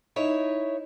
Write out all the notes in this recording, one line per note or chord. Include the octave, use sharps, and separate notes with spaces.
D#4 E4 C#5